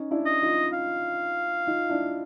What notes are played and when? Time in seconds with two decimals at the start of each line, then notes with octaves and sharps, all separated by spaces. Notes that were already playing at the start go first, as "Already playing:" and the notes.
Already playing: C#4 D#4
0.11 D4 E4
0.26 D#5
0.42 D#4 F4
0.74 F5
1.67 D#4 F4
1.90 D4 E4